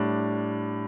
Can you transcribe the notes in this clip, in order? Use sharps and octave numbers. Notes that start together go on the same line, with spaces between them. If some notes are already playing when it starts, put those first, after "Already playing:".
Already playing: A2 G3 D4